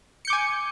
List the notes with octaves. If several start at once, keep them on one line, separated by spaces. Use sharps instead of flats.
G#5 D6 G6 C#7